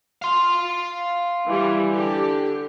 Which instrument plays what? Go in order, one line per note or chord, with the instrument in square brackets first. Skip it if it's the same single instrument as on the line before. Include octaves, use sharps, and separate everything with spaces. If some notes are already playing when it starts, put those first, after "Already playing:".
[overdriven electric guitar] F5 C6
[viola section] E3 G3
D3 G4